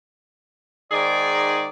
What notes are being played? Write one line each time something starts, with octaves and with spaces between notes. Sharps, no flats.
G#2 D#3 D#4 G#4 D5